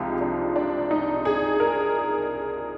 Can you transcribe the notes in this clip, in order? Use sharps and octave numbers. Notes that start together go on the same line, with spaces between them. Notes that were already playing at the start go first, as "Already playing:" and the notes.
Already playing: C2 C3 F3 G#3 D#4 F4 G4
D4
D4
D#4
G#4
A#4